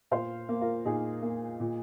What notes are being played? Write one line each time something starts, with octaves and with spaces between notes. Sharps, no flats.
A#2 C5 F5
A#3
F4 A#4
A#2 D#4 G#4
A#3
A#2